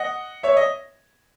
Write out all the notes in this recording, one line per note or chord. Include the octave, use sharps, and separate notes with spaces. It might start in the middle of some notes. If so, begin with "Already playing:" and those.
Already playing: D#5 F#5
C#5 E5
D#5